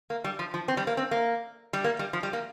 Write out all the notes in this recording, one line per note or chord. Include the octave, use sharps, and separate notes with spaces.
A#3
G3
F3
F3
C4
G3
A#3
C4
A#3
G3
A#3
G3
F3
G3
A#3